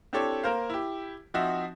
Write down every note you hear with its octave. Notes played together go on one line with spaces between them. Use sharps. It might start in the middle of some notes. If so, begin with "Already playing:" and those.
C4 D4 E4 G4 A4 C#5
A#3 A#4 C5 F5
E4 G4
F3 C4 D#4 F#4 E5